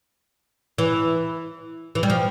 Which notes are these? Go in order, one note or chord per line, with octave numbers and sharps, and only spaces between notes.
E3
E3
G3
F3